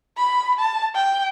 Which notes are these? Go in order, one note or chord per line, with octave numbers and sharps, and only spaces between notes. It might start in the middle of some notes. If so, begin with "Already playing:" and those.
B5
A5
G5